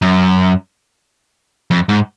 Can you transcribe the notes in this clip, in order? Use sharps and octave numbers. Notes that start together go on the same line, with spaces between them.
F#2
F2
G#2